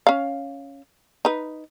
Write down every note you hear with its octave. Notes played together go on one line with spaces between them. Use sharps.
C#4 F5
D#4 B4